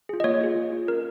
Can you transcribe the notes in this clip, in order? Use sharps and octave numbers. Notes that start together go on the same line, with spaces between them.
F4 G#4
D#5
A#3 C#5
F4 G#4
A#3
F4 G#4
C#4 A#4